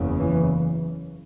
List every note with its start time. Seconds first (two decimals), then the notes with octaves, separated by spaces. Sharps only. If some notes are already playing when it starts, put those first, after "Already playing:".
Already playing: F#1 E2 C#3
0.19 E3